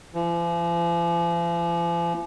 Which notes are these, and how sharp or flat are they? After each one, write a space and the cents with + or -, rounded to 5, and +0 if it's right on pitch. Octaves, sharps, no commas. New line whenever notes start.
F3 -45